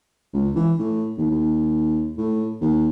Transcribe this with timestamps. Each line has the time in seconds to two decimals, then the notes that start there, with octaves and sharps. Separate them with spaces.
0.34 C#2
0.55 E3
0.79 A2
1.18 D#2
1.30 D#2
2.18 A2
2.61 D#2